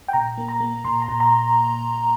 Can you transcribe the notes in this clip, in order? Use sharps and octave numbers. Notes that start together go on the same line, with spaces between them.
G5
A#2 A#5
A#3
A#5
A#3
A#2 C6
A#5
A#2
A#5